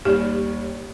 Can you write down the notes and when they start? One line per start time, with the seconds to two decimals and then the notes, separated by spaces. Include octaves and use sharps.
0.05 D#2 G3 G4